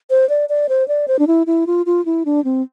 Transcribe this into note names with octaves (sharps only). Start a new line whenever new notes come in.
C5
D5
D5
C5
D5
C5
D4
E4
E4
F4
F4
E4
D4
C4